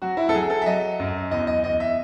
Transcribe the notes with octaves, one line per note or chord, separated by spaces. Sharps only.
F#3 F#4
E4
A4
F#3 G#4
A4
E5
F#3 D#5
F#2
E2 D#5
D#5
E2 D#5
E5